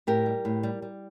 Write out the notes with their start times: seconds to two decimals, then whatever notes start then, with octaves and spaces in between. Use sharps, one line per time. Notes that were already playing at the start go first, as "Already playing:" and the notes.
0.07 A2 G4 A#4
0.26 G3
0.45 A2
0.63 G3
0.82 G3